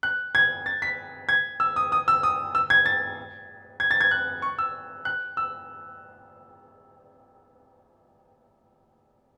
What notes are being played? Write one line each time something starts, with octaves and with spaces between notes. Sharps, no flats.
F#6
G#6
A6
B6
G#6
E6
D#6
D#6
E6
D#6
E6
G#6
A6
G#6
A6
G#6
F#6
C#6
E6
F#6
E6